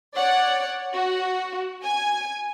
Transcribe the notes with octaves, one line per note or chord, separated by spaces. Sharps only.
C#5 D5 F#5
F#4
G#5